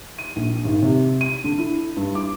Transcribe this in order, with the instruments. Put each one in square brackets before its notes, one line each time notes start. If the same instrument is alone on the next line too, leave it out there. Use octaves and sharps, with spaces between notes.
[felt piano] D#7
A#1
G#1
C3
D#7
D3
E4
G2
D6